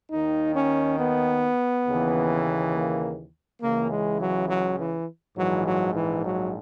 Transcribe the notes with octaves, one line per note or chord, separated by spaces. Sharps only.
D#2 D#3 D#4
C#4
B3
D#2 C#3 E3
A#3
C#2 C#3 E3 A#3
G#3
F#3
F#3
E3
A#1 G#2 E3 F#3
F#3
E3
F#3